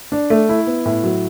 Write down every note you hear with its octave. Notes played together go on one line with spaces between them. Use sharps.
D4
A3
E4
B3
A2
F#3